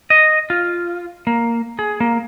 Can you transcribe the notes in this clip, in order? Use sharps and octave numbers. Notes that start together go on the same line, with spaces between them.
D#5
F4
A#3
G#4
A#3